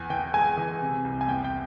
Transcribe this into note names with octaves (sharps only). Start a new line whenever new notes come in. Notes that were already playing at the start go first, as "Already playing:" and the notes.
Already playing: E2 G#5
E3 G5
G#3 G#5
E3
C3
C2
G#5
E2 G5
G5